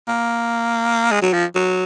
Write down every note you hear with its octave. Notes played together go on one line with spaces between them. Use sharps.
A#3
G#3
F#3
F3
F#3